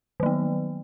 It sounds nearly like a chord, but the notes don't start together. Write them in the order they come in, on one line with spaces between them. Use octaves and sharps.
D#3 F#3 B3